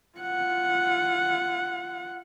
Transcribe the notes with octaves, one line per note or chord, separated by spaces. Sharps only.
F4 F#5